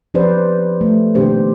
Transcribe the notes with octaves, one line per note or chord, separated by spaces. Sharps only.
F3 G4 B4 C5 D5
A3
B2 D#3 A#3 D4 G4 C5